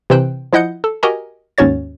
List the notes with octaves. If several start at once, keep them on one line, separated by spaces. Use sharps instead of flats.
C3 E3 C4 C5 G5 F#6
F3 E4 D#5 F#5 G6 C#7
A4
F#4 G4 A#4 D#5 G#5 A#5
D#2 G#2 C#4 F#4 C#5 A6